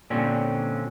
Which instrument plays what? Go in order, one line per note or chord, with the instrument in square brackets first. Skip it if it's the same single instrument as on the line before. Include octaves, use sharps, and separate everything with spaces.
[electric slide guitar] A#2 D3 C4 C#4